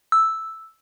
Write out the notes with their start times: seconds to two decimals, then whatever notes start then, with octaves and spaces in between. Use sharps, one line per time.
0.12 E6